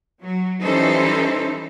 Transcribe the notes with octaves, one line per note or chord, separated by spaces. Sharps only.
F#3
E3 G3 C#4 D#4 A4 C5